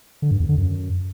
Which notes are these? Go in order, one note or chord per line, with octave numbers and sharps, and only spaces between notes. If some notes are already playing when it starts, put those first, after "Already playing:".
D3
G2
E2
D3
F#2